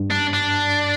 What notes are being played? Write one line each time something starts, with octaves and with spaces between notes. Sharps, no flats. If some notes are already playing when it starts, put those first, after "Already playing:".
Already playing: G2
D4
D4